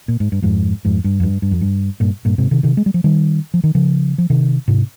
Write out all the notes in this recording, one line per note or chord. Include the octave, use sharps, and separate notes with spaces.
A#2
G#2
G2
F2 G#2
F2 G#2
G2
F2
G2
G2
F2
G2
G2 A#2
G2 A#2
G#2 C3
C3 D#3
C3 D#3
G#3
G3
F3
D#3 G3
F3
D#3
C#3 F3
F3
C3 D#3
G#2 C3